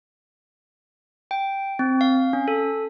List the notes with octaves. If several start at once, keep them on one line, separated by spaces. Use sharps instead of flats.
G5
C4
F5
C#4
A4